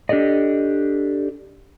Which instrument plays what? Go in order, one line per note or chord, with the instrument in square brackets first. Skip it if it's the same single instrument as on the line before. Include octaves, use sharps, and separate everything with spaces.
[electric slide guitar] D4 G4 A4 D5 D#5